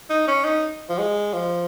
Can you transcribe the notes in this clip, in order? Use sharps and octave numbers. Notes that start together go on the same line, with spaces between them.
D#4
C#4
D#4
F3
G#3
F3